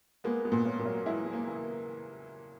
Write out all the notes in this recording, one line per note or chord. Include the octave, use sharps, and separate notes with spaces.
G#3 A#3 B3
G#3 B3
A#2
A#3 C#4
A#2
F#3 A#3
E3 G#3 E4
E3 G#3
A#3
C#3 E3